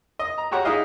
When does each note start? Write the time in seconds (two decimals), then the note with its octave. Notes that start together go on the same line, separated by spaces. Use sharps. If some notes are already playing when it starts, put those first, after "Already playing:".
0.19 D#5
0.38 A#5
0.51 F#4 G4 C#5 F#5 A#5
0.65 D#4 E4 G#4 D#5 F5